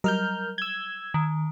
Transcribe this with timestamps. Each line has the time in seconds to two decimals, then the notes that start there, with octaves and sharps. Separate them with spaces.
0.04 F#3 G3 A#4 D#5 F6 G6
0.58 E6 G#6 G7
1.14 D#3